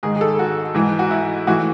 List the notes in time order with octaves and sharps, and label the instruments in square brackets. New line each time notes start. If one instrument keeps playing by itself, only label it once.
[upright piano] G#2 D#3 G#4
G#4
A4
F#4
G#2 E3
F#4
E4
A2 E3 F#4